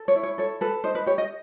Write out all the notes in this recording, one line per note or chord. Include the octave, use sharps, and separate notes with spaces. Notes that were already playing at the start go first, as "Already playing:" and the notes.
Already playing: A4
C#5
E4
C#5
A4 C#5
A4 B4
D#4 C5
B4
G4 C#5
D#5